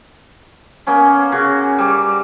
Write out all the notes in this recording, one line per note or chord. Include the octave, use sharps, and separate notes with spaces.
A#3 B3 C#4
C#3 F#4
G3 D6